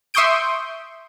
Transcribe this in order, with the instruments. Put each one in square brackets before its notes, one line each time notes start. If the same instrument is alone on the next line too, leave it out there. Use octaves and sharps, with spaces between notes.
[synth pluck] E5 C6 C#6 D#6 G6 D7